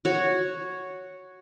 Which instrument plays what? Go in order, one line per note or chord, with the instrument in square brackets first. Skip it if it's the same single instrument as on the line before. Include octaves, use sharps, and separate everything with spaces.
[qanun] F#4 C#5